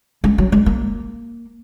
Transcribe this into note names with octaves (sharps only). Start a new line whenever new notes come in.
G#3
F#3
G#3
A#3